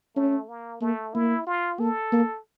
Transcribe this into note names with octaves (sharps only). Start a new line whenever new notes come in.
A3 C#4
A#3
A3 A#3
A#3 E4
F4
A#3 A4
A#3